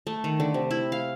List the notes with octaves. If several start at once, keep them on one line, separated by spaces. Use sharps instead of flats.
A3
D#3
D3
C3
E4
F5